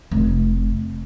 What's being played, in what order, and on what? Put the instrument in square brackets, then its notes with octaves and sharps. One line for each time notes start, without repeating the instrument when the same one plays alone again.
[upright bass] F1